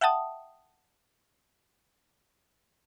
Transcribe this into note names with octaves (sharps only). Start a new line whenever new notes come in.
E5 F#5 G5 A5 D#6